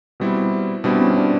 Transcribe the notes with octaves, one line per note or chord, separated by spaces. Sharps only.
B2 G3 C4 E4
B2 G3 C4 D4 E4
C#4
D4